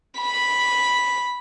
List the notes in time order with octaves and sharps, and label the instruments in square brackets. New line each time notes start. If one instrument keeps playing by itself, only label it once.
[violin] B5